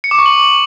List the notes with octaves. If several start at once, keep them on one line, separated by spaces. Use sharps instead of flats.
C#7
D6
C#6
F#7